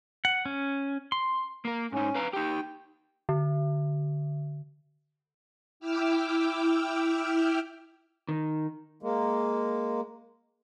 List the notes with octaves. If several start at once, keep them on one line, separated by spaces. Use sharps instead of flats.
F#5
C#4
C6
A#3 A#4
G#2 C#4 D#4
B4 F5 A#5
D#4 G4 G5
D3
E4 G5 D6 E6 F6
D#3
G#3 A#3